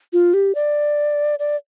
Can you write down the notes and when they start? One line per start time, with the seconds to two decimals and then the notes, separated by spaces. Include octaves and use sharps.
0.13 F4
0.34 G4
0.55 D5
1.39 D5